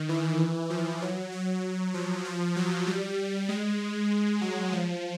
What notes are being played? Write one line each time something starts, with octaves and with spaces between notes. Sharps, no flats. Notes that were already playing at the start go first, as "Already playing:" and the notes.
Already playing: D#3
E3
F3
F#3
F#3
F3
F3
F#3
G3
G#3
F#3
F3